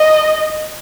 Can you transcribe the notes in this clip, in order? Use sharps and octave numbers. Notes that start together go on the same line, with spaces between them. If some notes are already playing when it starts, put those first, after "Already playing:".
Already playing: D#5